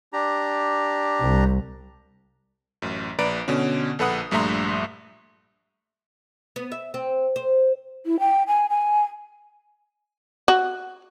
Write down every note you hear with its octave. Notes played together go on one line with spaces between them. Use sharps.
D4 G4 A#5
C2
A1 F#2
A#1 B4 D5 A#5 D7
B2 D3 C#4
A#1 A4 B4 F#5 D#6
A#1 G2 A3 E5 A#5 C6
B3
E5
C4
C5
E4
G5
G#5
G#5
F#4